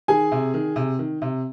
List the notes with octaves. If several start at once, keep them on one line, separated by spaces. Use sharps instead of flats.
D#3 G#4 G#5
C3
D#3
C3
D#3
C3